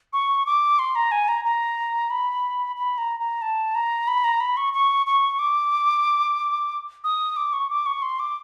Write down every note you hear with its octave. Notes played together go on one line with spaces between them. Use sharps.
C#6
D6
C6
A#5
G#5
A#5
A#5
B5
B5
A#5
A#5
A5
A#5
B5
A#5
B5
C#6
C#6
C#6
D6
D#6
D6
C#6
D6
C#6
C6
D6